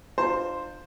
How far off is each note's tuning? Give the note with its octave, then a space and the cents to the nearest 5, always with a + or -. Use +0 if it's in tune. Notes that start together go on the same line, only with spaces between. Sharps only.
D4 +45 F4 +0 C5 +0